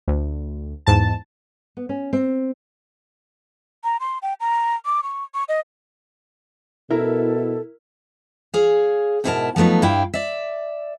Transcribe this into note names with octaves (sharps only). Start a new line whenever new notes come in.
D2
E2 G#2 A5
B3
C#4
C4
A#5
C6
G5
A#5
D6
C#6
C#6
D#5
B2 E4 A4 A#4
G#4 C#5 F5
G#2 B2 E4 A4 A#4 A5
F3 F#3 A3 B3 D#4
G2 E4 F5 G5
D5 E5